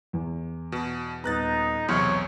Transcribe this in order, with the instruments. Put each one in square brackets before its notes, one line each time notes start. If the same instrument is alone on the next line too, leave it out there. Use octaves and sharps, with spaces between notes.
[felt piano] E2
[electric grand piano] B2
[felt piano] D#1 B3 [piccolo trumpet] D#4 [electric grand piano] A#5 F#6 A6
[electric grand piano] B1 E2 [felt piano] C3 C6 F6 [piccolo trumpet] C#5